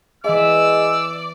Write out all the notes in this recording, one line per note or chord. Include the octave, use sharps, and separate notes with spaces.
E3 G#3 D5 E5 E6